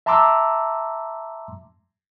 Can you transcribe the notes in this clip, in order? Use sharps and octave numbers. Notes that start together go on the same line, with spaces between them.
E5 A5 A#5 C6 D6 E6